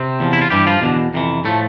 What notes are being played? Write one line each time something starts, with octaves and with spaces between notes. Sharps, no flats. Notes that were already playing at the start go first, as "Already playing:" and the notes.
Already playing: C3 C4
E2 D3 F3
E4
F4
G2 E3 G3 G4
F3 F4
E2 B2 D3 D4
F2 C3 E3
A2 F3 A3